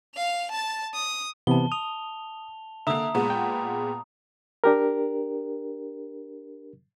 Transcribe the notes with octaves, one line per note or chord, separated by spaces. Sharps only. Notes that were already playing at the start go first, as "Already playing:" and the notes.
F5 F7
A5 A6
D#6
C3 E3 B3 A5 G7
D#6 F7
D3 A#3 E5 A#5 D#6
A#2 G#3 B3 A#5
G5
D4 G4 A#4